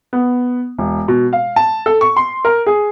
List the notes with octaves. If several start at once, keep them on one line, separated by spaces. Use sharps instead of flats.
B3
E1
B2
F5
A5
A4
C#6
C6
A#4
G#4